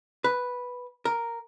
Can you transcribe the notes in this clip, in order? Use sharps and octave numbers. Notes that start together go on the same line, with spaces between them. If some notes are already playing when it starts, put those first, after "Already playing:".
B4
A#4